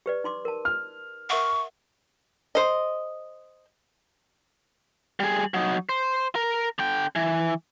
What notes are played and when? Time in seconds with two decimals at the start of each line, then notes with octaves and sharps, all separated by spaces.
0.06 G4 B4 D5
0.24 D#4 C6 D6
0.45 A#4 A5
0.65 F6
1.30 A#4 E5 F#5 C#6
2.55 C5 D#5
5.20 G3 G#4
5.54 F#3 D#4
5.89 C5
6.36 A#4
6.79 D3 G5
7.16 E3